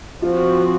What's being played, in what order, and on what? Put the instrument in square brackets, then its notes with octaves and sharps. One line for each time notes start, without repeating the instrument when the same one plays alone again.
[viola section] F3 C4 F#4 [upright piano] F4